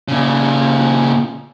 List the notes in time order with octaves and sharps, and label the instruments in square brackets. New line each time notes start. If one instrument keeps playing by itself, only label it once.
[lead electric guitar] A#2 C#3